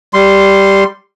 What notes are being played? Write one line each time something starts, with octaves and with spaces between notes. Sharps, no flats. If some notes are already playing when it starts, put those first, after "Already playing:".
G3 C6